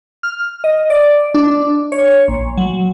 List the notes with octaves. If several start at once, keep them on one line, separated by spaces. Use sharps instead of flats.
F6
D#5
D5
D4
C#5
A#1
F#3